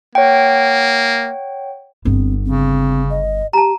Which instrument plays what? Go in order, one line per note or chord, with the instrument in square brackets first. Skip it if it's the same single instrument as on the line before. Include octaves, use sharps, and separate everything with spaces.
[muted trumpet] A#3 [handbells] C#5 F#5 G5
[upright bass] G1 B3 [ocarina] C4
[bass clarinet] C#3 [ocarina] C4
[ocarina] D#5
[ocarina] G4 [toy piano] A5 A#5